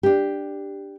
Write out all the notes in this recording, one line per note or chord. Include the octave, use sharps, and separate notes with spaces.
D4 G4